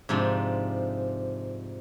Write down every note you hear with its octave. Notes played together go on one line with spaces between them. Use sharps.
G#2 C3 F3 D4